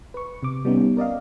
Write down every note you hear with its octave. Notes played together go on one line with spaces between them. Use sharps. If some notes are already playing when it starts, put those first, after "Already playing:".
B4 C#6
C3 D6
G3 B3 C#4 D#4
A#4 D5 D#5 F5